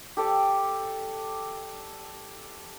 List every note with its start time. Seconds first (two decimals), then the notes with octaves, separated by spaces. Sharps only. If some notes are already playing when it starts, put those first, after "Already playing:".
0.17 G4 A4 D5